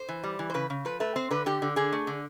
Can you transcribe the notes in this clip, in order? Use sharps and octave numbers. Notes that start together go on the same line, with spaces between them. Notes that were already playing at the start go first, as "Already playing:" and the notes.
Already playing: C5
E3
G3
E3
C5
C#3 B4
C#3
F3 B4
A3 B4
C4 C5
D3 B4
D3 G4
D3
D3 G#4
A3
D3